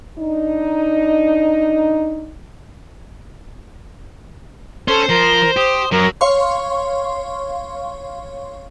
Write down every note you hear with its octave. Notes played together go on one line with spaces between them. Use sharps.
D4 D#4
C#4 A4 C5 C#5
F3 A#4
G4 D#6
F#2 F#3 A#4
C#5 F5 C6 C#6